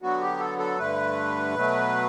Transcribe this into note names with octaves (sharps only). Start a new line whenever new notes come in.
D3 F#3 B3 F#4
G4
A4
A4
G2 D3 A3 B4
B2 F#3 A3